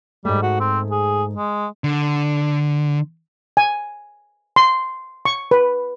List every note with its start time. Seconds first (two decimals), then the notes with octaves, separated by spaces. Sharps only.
0.25 G#2 G3 A3
0.43 F#4
0.60 C4
0.91 G#4
1.35 G#3
1.84 D3
3.57 G#5
4.56 C6
5.25 C#6
5.51 B4